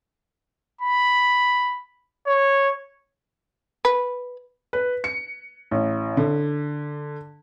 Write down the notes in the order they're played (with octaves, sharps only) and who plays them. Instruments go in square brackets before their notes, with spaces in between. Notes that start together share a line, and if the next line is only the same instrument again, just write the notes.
[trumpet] B5
C#5
[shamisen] B4
[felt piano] B4
C#7
A1
D3